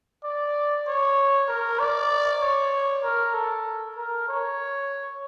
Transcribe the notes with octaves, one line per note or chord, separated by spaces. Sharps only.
D5
C#5
A#4
D5
C#5
A#4
A4
A#4
C#5